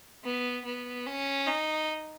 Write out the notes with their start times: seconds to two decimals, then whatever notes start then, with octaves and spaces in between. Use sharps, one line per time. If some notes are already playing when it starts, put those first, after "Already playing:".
0.24 B3
0.65 B3
1.06 C#4
1.47 D#4